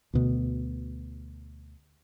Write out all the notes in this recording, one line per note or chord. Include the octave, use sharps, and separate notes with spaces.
D2 B2